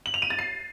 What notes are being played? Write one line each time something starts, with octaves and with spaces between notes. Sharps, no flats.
F#7
F7
D#7
A6
C7